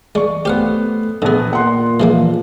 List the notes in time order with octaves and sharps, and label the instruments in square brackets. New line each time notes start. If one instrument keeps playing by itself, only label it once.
[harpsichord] G#3 [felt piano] D5 C#6
[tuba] A3 [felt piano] B3 C5 [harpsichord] G4 F5 F#5
[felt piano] A#1 B3 [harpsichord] D3 G#4
[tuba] A#2 [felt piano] F#5 C6
[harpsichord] E3 G#3 A#3 [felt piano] F3